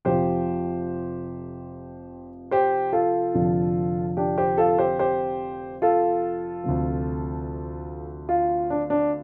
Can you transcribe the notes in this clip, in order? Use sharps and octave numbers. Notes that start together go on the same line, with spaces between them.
F1 F2 C3 F3 G4 C5
G4 C5
F4 A4
F1 F2 D3 F3
D4 G4
G4 C5
F4 A4
G4 C5
G4 C5
F4 A4
D2 C3 F3
F4
D4
D4